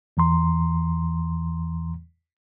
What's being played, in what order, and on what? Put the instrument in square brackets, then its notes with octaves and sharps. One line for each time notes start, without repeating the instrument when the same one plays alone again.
[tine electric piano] E2 E3 A#5 C6